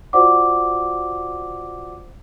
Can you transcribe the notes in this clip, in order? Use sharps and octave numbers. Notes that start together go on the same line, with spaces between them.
F4 F#4 C5 D5 F#5 D6